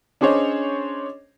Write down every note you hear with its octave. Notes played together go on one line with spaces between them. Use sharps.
C#4 D4 G#4 C5 C#5 D#5